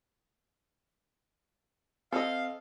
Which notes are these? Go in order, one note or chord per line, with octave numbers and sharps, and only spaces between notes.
C4 A4 D#5 F5